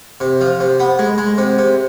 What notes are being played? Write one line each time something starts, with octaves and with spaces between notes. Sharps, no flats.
C3
F3
C3
B3
G#3
G#3
C3
C3